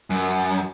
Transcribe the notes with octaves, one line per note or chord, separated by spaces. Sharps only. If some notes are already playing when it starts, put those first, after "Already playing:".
F#2